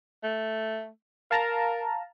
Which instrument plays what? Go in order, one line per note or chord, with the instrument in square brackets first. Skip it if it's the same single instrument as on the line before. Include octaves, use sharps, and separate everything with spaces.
[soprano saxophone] A3
[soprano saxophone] A#4 [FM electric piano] F5 A5 A#5